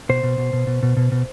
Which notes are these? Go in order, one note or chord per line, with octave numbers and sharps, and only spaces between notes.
B2 C5
B2
B2
B2
B2
B2
B2
B2